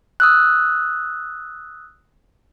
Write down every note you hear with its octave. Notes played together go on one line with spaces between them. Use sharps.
D#6 E6 F#6